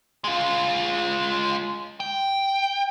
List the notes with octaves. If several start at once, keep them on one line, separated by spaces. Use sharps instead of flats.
G#3 F4
G5